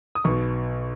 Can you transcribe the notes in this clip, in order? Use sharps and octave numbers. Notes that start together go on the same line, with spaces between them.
D#6
B1 B2 C#6